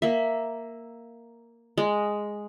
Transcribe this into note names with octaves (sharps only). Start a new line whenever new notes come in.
A#3 E5
G#3